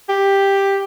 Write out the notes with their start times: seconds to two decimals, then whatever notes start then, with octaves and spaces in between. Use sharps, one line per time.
0.09 G4